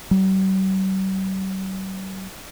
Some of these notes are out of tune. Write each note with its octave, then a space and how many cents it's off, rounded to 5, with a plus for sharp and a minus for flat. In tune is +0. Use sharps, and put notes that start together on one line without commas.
G3 -45